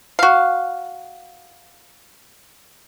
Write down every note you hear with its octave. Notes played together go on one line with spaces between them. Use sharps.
F#4 F5